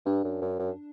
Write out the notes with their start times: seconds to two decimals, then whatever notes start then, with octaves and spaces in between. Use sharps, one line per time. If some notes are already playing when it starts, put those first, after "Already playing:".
0.06 G2 D4
0.24 F#2
0.42 F#2
0.59 F#2